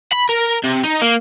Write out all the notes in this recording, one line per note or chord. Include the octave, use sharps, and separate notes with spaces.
B5
A#4
C3
D#4
A#3